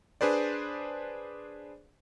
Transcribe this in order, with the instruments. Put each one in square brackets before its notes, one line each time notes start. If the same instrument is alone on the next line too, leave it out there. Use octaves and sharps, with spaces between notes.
[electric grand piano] D4 G#4 B4 C5 D5